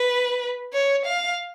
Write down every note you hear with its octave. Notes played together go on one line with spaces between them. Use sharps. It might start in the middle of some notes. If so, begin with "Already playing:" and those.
Already playing: B4
C#5
F5